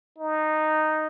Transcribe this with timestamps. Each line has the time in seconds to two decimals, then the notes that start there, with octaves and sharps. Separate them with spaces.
0.19 D#4